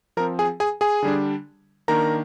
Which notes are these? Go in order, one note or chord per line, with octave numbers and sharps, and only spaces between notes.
F3 C4 A#4 A#5
G#4 G#5
G#4 G#5
G#4 G#5
D3 G3 D4
D#3 A#3 D4 A#4 A#5